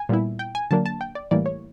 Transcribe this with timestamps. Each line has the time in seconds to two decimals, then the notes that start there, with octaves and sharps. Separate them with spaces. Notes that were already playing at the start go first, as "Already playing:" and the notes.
Already playing: G#5
0.09 A#2 G3 B3 E4
0.39 G5
0.55 G#5
0.71 D3 F#3 A#3 D4 A5
0.86 A5
1.01 G5
1.15 D5
1.31 A2 E3 G3 A#3 D5
1.46 C#5